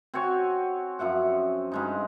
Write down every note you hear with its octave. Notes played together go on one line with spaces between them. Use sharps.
C4 F#4 C#5 G#5
F#2 F3 E5 F#5
G2 G#3 D#4